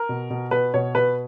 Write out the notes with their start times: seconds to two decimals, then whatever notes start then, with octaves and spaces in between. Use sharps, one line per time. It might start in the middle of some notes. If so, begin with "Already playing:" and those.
Already playing: A#4
0.09 B2
0.30 B2
0.51 B2 B4
0.74 B2 C#5
0.95 B2 B4